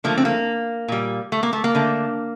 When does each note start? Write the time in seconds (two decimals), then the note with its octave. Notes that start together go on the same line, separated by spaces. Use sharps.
0.04 D3 F3 A3 A#3
0.18 C4
0.25 A#3
0.88 A#2 G3
1.32 A3
1.43 A#3
1.53 A3
1.64 A#3
1.75 D3 A3